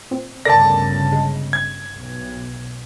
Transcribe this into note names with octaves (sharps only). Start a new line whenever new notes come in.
A#2 C4
G1 D2 C#3 A4 A#4 D5 A5 A#6
G#3
G#6
B1